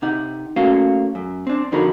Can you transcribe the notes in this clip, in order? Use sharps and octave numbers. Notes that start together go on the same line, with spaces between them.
C3 D#4 F#5
A3 A#3 C#4 F#4 F5
F#2
C4 D4
F2 D3 D#4 F#4 A#4 B5